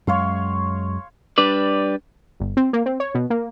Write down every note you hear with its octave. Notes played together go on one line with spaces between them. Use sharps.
F#2 G#3 C#5 F5 C6
G3 D4 B4 D5
G1
C4
A#3
C4
C#5
B2
A#3